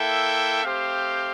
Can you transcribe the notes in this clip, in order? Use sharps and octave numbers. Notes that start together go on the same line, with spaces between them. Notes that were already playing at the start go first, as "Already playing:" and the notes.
Already playing: A#3 E4 A4 E5 G5
A3 C4 G4 C5 F5